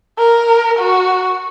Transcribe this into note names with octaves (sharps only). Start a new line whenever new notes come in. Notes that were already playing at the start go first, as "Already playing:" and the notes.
A#4
F#4